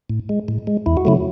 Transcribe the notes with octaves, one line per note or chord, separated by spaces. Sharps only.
A2
G#3
A2
G#3
E2 E4
F#4
C#3 F#3 A3 E4